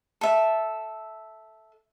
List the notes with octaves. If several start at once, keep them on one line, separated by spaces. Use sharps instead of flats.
A4 E5